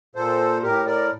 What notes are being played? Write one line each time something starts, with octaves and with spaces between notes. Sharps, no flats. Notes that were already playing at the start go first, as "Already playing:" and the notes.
A#2 A4 C5
A2 G4 A#4
A#4 D5